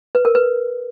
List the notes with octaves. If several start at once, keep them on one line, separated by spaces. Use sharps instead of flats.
B4
A#4
B4